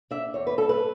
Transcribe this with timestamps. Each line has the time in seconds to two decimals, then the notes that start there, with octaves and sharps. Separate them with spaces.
0.11 D4 E5
0.34 E2 C#5
0.47 B4
0.58 G2 A4
0.69 B4